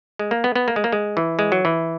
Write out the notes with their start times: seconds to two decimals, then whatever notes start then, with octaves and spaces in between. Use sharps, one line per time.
0.19 G#3
0.31 A#3
0.44 B3
0.55 B3
0.68 A#3
0.76 G#3
0.84 A#3
0.93 G#3
1.17 E3
1.39 G#3
1.52 F#3
1.65 E3